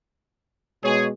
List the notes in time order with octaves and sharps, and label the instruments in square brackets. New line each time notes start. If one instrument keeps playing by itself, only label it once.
[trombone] B2 [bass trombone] G#3 [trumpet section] G#4 [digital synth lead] C#5